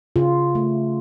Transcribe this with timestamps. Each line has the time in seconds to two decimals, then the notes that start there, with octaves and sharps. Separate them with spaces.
0.16 C#3 F4
0.55 A3